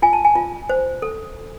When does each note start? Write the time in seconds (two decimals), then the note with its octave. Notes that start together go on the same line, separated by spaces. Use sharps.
0.02 F4 G#5
0.13 A5
0.25 G#5
0.36 F4
0.69 C5
1.02 A4